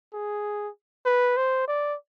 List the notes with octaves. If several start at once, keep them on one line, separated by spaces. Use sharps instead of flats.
G#4
B4
C5
D5